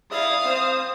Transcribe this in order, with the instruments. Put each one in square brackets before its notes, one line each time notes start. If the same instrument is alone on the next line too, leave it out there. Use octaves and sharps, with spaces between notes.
[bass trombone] E4 [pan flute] D5 [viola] F5 [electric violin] D#6
[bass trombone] C4 [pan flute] C5